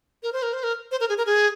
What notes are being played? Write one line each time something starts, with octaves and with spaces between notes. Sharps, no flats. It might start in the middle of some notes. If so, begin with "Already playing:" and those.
A#4
C5
A#4
C5
A#4
C5
A#4
G#4
A#4
G#4